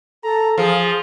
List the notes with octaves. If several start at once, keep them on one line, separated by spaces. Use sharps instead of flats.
A4 A#5
F3 G#4 F5